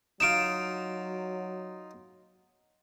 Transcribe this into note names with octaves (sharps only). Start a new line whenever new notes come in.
F#3 D#4 F4 D7 E7